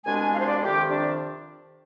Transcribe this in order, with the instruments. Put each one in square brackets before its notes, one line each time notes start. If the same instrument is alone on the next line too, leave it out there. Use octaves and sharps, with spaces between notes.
[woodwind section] C2 B2 G#3 D4 G#5
G#5
F5
C5
D5
F2 C3 D#3 G4
D4